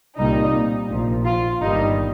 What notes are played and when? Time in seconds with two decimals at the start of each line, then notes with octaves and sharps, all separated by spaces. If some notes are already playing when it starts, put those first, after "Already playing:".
0.17 C2 A#2 G3 D#4
0.90 A#1 A#2 F3
1.25 F4
1.61 G1 G2 D#3 G3 D#4